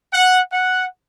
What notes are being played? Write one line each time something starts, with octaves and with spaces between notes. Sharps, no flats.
F#5
F#5